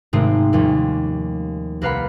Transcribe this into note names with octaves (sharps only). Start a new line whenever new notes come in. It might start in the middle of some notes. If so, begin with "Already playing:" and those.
G#1 G#2 C3 A3 C4 D#6
D#2 F3 G3 C#4
C2 A#3 B4 F5 F#5 B5